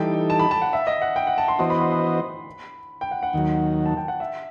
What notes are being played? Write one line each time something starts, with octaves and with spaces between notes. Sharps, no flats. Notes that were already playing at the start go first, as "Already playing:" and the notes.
Already playing: E3 G3 D#4 A4 G5
A5
B5
A5
F#5
E5
D#5
F#5
G5
F#5
A5
C6
E3 B3 F#4 C5 D#5 C6
B5
C6
B5
G5
F#5
F#5
D#2 D#3 F#3
A5
G5
F#5
E5